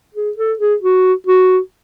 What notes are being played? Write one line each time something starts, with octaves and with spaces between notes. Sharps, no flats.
G#4
A4
G#4
F#4
F#4